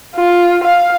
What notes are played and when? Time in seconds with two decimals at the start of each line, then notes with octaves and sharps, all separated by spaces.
0.16 F4
0.64 F5